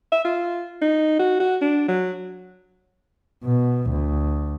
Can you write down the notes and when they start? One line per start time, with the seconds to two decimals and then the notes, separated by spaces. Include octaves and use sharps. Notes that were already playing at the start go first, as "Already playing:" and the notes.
0.12 E5
0.25 F4
0.81 D#4
1.19 F#4
1.40 F#4
1.61 D4
1.88 F#3
3.44 B2
3.90 D2